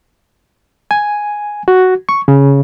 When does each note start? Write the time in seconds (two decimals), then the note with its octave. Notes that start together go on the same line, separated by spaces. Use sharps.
0.91 G#5
1.68 F#4
2.09 C#6
2.28 C#3